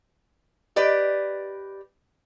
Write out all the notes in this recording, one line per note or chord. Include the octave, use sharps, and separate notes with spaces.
G4 B4 D5 D#5